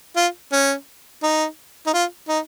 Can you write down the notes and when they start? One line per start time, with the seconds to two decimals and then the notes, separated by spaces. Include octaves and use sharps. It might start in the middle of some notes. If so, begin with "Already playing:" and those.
0.16 F4
0.52 C#4
1.23 D#4
1.87 D#4
1.94 F4
2.28 D#4